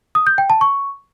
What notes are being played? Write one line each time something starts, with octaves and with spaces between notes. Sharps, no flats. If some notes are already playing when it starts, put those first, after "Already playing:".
D#6
G6
G5
A5
C#6